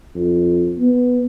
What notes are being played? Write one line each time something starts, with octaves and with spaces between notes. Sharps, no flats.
F2
B3